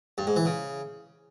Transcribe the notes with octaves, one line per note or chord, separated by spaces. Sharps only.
G2
G#2
E3
C#3